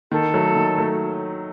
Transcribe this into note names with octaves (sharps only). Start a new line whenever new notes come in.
D#3 A4
F#3 A3
D#3
F#3 A3